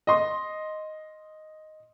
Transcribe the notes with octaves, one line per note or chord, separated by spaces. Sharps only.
D#5 C6